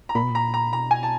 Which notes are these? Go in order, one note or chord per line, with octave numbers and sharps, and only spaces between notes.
A#5
A#2 B5
B2
A#2 A#5
A#5
B2 A#5
G#5
A5